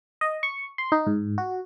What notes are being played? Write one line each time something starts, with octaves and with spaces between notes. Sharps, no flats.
D#5
C#6
C6
D#4
G#2
F#4